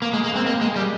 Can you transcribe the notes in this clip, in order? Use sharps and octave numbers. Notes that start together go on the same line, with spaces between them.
A#3
G#3
A#3
C4
A#3
G#3
G3